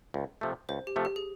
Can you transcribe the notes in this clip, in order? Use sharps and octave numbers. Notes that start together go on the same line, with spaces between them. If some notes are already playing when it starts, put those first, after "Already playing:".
C#2
C3 F3 A3
C#2 C5
G4
C3 F3 A3
G4
G#4